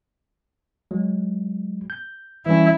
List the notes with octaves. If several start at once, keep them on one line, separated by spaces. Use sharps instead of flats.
F#3 G#3
G6
E3 G3 C#4 E4